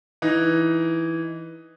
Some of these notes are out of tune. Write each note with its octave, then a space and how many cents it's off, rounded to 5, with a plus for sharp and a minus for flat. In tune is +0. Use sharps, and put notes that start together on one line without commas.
E3 +0 D#4 +0